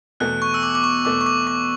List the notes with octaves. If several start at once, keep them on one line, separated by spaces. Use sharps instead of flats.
E2 B2 A3 F#6
C#6
E6
D6
D6
C#6
E2 B2 A3 D6
C#6
D6
D6